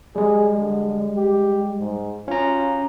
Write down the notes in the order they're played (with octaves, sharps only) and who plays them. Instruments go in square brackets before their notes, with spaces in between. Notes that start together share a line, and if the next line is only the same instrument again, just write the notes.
[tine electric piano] G3 G#3 [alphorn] G#4
[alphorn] D3
G4
G#2
[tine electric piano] C#4 A#5 [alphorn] F4